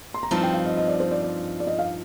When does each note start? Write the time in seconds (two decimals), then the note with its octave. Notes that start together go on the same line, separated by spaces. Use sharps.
0.14 C6
0.23 A#5
0.31 G2 F3 C4 D#4 A5
0.43 G5
0.54 F5
0.65 D#5
0.77 D#5
0.88 D5
1.00 C5
1.11 D5
1.22 D5
1.60 D5
1.67 D#5
1.79 F5